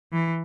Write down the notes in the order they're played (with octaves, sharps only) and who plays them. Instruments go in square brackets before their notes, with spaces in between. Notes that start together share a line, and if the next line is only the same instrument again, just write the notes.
[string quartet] E3